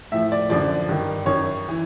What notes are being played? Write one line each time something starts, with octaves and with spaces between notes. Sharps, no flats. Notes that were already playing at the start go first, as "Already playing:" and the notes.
A2 F3 E5
D5
F#2 D3 F3 D5
G2 D#3
F#2 D#3 C#5
E3